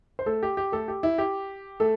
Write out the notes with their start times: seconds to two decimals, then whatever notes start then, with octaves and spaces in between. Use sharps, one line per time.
0.19 C5
0.26 A3 A4
0.43 G4
0.57 G4
0.72 A3 A4
0.88 G4
1.03 E4
1.18 G4
1.80 A3 A4